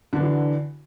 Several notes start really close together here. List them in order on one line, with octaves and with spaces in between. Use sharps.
D3 D4 E3 F#4